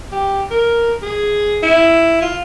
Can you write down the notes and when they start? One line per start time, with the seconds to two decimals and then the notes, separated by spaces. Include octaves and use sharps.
0.12 G4
0.51 A#4
1.02 G#4
1.63 E4
2.22 F4